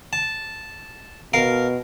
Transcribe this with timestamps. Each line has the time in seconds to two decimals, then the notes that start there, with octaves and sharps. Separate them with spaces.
0.13 A5
1.34 B2 A#4 F5